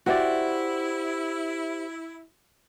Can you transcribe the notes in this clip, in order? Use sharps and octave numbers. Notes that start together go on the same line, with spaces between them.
E4 F#4 G4 C5 D5 E5